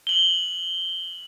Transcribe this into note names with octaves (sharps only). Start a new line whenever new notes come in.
F#7 G7